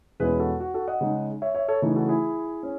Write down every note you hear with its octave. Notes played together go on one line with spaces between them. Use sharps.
E2 B2 G#3 C#4 E4 G#4 B4
F#4 A4
F#4
F#4 A4
D#5 F#5
C#3 G#3 D#4
C#5 E5
C#5 E5
A4 C#5
C#3 E3 A3 D#4
F#4 A4
E4 G#4
C#4